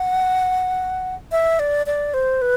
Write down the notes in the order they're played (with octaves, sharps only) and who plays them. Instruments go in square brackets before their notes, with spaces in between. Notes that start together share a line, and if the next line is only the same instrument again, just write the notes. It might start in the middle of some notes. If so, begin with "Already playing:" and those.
Already playing: [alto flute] F#5
E5
D5
D5
C5
B4